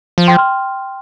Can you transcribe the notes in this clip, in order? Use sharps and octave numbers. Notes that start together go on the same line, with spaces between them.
F3
G5 C6
C6 F6